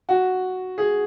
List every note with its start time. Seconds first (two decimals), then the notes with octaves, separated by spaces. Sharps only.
0.09 F#4
0.78 G#4